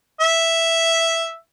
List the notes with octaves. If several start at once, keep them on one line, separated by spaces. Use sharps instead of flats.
E5